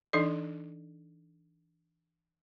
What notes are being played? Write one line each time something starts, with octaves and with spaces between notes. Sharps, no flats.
E3 D4 D#4 A4 D5